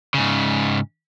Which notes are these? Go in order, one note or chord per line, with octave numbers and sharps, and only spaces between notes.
G#2 C#3